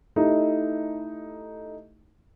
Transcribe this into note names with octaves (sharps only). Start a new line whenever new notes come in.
A3 D#4 E4 G4 D#5